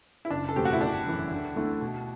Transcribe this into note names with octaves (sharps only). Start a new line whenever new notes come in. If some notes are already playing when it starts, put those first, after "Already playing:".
E4
F#1 D4
A4
E2 B2 A3 C4 G4
F#4
E4
G1 D4
F#2 E3
D2
D3 A3 E4
B2